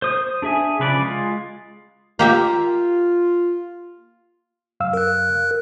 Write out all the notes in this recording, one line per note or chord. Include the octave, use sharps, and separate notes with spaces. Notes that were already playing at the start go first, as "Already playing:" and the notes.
C5 D#6
D4 G#4 E5 G#5
C#3 F3 B4 C#5 D5
G#3 F4
A#3 F4 G4 E5
F#2 F5 E6
A#4 F#6